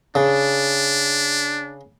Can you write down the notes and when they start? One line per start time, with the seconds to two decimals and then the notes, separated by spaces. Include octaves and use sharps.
0.15 C#3 D4